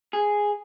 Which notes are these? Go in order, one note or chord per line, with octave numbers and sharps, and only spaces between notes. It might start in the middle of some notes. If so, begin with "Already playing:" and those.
G#4